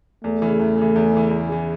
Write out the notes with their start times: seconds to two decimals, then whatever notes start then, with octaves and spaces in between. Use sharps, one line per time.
0.24 E2 A3
0.42 C#3 E3
0.60 E2
0.77 C#3 E3
0.96 E2
1.13 C#3 E3
1.31 E2
1.49 C#3 E3